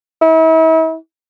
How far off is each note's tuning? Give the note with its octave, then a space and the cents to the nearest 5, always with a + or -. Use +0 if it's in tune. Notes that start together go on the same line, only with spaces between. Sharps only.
E4 -40